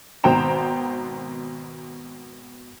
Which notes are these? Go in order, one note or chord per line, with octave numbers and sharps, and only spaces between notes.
G#1 B2 C5 G5 A#5 E7